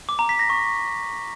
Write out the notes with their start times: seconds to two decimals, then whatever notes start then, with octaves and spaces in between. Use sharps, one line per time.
0.09 D6
0.19 A#5
0.29 B6
0.39 A#6
0.50 C#6